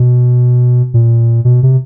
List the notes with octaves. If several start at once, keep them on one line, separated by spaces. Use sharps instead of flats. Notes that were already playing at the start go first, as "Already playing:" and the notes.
Already playing: B2
A#2
B2
C3